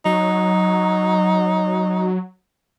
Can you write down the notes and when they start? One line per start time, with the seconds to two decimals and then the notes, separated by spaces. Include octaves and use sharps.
0.05 F#3 D#4